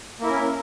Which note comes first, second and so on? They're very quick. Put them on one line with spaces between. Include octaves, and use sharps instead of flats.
A#3 E4 A#4 C#4